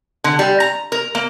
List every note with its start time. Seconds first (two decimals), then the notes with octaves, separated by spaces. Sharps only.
0.24 D3
0.39 G3
0.60 A#5
0.92 A#4
1.15 A#3